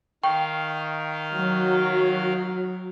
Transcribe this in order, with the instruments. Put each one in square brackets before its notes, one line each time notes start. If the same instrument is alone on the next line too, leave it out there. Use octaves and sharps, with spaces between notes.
[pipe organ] D#3 F5 [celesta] G5 C#6
[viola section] F#3